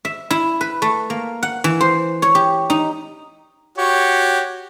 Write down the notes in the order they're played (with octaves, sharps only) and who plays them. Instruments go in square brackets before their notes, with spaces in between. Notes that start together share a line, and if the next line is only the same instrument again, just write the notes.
[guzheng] E5
E4
B4
A3
A#3
F#5
E3
C5
C#5
G4
D#4
[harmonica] F#4 G4 C#5